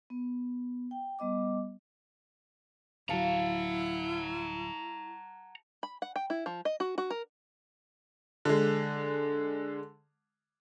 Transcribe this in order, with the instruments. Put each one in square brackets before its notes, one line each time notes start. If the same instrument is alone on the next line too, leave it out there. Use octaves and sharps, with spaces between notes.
[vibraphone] B3
G5
G3 B3 D#5 D6
[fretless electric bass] D1 F#3 [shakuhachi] E4 [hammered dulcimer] F5 A5 [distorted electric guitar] F#5 A#5
[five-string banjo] B5
F#5
G5
E4
F3
D#5
F#4
F#4
A#4
[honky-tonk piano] D3 G#3